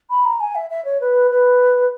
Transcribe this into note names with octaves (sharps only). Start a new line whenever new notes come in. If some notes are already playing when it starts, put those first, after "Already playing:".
B5
A#5
G#5
E5
E5
C#5
B4
B4